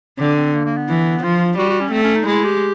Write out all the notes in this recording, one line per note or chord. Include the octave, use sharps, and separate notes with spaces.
D3 C4
C4
A#3
A#3
B3
E3
F3 F4
G3 F#4
F#4
C#4
A3 C4
C#4
D#4
G#3 E4
G4